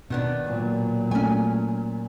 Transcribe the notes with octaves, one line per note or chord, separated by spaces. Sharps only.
B2 D#3 B3 D4
A#2 F#3
A3 C#4 G#5